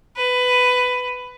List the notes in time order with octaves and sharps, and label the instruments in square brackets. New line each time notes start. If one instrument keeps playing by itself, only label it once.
[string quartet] B4